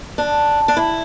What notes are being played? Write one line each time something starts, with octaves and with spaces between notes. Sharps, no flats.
D4
D4
E4